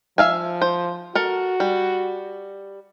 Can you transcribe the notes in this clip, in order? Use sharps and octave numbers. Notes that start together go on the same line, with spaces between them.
F3 E5 F5 G#5
C5
F#4 A4 A#4
G3